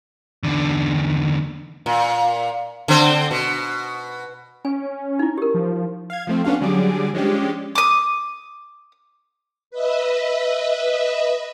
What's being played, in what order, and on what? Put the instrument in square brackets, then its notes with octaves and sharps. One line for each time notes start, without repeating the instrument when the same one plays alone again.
[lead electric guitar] E2 D3
[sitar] A#2
D3 C4
B2
[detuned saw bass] C#4 [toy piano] G#5
[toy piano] D#4 E4
G4 A#4
[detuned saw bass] F3
[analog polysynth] F5 G#6
F3 A3 C4
B3 C#4 D4 F#4 F5
D3 F#3 G3 G#4 D6
F3 G#3 C#4 D4 G4
[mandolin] D6 D#6
[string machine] B4 D#5 E5